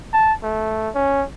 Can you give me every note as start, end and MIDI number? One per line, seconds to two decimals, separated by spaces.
0.14 0.33 81
0.43 0.90 57
0.94 1.24 61